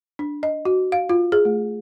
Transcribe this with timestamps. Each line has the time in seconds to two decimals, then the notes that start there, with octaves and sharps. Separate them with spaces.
0.19 D4
0.43 D#5
0.65 F#4
0.92 F5
1.10 F4
1.32 G#4
1.45 A3